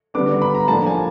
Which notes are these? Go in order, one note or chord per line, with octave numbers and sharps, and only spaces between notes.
D3 G3 B3 D4 D6
B5
A#5
A2 F3 A#3 D4 F4 A5
G#5